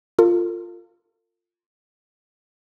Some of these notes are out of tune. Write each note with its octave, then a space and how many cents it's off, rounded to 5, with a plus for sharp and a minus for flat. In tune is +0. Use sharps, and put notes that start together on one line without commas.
F4 +0 A4 +45